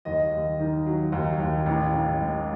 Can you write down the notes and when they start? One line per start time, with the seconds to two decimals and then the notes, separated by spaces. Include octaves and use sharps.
0.05 D#2 D#5
0.32 D#2
0.60 D#3
0.86 F#3
1.12 D#2
1.40 D#2
1.66 A1
1.93 A1
2.20 G#2